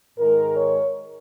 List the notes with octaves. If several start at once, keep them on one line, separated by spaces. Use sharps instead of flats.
G#2 D#3 G#3 A#4
C#5